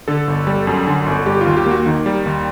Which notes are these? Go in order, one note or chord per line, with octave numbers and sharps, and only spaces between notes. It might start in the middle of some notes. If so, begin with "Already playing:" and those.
D3 A4
G1
G3
F#2
D3
G1
G3 G4
D#2 F4
G4
A#3 F#4
D#3
G3
D#2